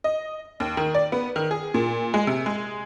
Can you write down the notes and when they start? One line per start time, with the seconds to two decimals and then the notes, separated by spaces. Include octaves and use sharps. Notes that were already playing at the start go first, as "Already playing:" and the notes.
0.04 D#5
0.60 D#2
0.77 D#3
0.95 D5
1.12 B3
1.36 D#3
1.51 G#4
1.74 A#2
2.14 G#3
2.27 C3
2.46 G#3